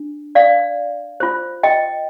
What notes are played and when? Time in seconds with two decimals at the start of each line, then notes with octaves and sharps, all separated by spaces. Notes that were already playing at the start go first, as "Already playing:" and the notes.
Already playing: D4
0.35 D5 F5
1.20 F4 C5
1.63 D#5 G5